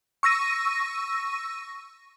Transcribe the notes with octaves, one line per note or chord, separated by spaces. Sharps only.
C#6 E6 A#6 D#7